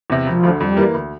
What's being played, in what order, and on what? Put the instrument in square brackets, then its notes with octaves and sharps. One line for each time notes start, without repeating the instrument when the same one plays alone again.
[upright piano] E2 C3
[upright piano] E1 [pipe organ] F3
[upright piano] D2 D3
[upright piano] F2 [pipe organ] G3
[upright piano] E3 A#3
D2